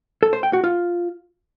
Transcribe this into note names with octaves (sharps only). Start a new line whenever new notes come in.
A4
C5
G5
F#4
F4